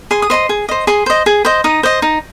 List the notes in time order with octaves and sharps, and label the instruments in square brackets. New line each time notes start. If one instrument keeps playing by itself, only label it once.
[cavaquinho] G#4 C6
D#6
C5 D#5 C6
G#4
C5 D#5
G#4 C6
C5 D#5
G#4
C5 D#5
D#4 D#6
C5 D#5
D#4